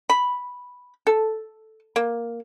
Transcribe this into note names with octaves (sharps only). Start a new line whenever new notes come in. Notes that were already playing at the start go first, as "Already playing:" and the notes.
B5
A4
A#3